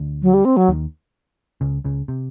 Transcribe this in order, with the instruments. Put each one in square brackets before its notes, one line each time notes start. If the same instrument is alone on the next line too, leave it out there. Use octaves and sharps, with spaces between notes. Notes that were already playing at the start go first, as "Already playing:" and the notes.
Already playing: [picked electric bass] D2 D3
[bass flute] F#3
G3
C4
F#3
[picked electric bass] D#2 D#3
C#2 C#3
C#2 C#3
C3